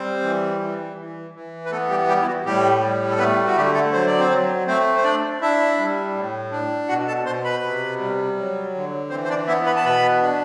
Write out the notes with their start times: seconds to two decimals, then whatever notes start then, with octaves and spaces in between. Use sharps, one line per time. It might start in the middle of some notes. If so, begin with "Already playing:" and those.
Already playing: G3 C4 C5
0.23 E3
0.60 E3
0.98 E3
1.34 E3
1.66 B4
1.71 A3 B3 A4
1.90 G3 G4
2.08 G3 G4
2.22 E4
2.27 F#4
2.45 A2 G3 G4
2.82 G3
3.11 A4
3.19 A3 B3 B4
3.46 F#4
3.56 D3 G3 G4
3.74 A3 A4
3.92 F#3 C5
4.07 D5
4.19 C4 C5
4.30 F#3
4.66 A3 C4 C5
4.97 C5
5.04 D4 D5
5.41 D4 E4 E5
5.78 G3
6.15 A2
6.52 D4
6.88 B2 F#4 F#5
7.07 A4 A5
7.25 B2 C5 C6
7.44 B4 B5
7.63 C3
7.99 G3
8.37 F#3
8.74 D3
9.10 E3 C4 C5
9.24 C5
9.29 D4 D5
9.47 B3 E4 E5
9.66 B4 B5
9.76 A5
9.84 B2 B4 B5
10.22 D4